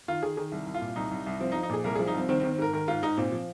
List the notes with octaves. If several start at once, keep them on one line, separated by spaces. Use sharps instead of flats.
D#3 F4
D#3 G#4
D#3 G#4
C2
C2
F4
A#2
C2 D#4
C2
C2
F3 C4
D#4
F3
D#4
A#2 G#4
C2 A#4
F3 G#4
D#4
C2 C4
D#3 C4
C4
D#3
C4
G#2 A#4
D#3 A#4
G#2 F4
G#2 D#4
A#2 C4
F3